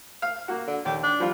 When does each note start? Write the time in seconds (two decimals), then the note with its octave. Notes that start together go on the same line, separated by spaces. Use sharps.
0.22 F5
0.48 A#3 F#4
0.67 D3
0.85 D#2 G4
1.03 D4
1.20 F3 G3 F4